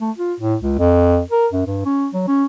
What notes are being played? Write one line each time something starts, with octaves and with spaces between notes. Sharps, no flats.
A3
F4
A2
C#2
F2
A#4
F#2
G2
C#4
F#3
C#4